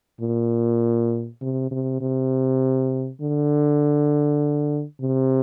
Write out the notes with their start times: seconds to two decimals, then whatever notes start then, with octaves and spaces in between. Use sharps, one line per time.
0.21 A#2
1.41 C3
1.71 C3
2.01 C3
3.21 D3
5.01 C3